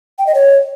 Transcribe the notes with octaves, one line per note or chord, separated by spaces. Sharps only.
G5
D#5
C#5